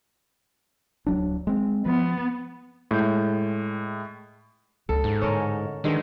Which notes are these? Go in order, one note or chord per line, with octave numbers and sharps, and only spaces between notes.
D1 F#3 D4
G#3 C4
F3 B3
A2 G#3 G6
C#2 A4
G#2 C#4
A2 D3 C#4 A4 A#4
D3 D#3 G#3 B3